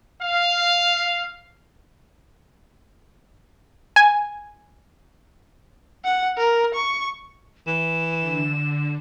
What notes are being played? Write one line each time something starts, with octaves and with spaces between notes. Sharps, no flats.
F5
G#5
F#5
A#4
C#6
E3 E7
D3